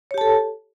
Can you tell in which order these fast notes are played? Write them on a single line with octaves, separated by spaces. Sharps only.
C#5 G4 A5 A4